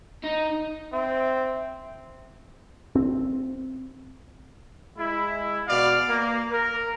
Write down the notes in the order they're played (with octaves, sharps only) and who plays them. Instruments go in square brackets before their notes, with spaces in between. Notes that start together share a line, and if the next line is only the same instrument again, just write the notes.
[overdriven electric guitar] D#4
[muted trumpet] C4 [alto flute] E5
[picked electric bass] C4
[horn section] G#3 E4
B2 D5 F5
A#3
A#4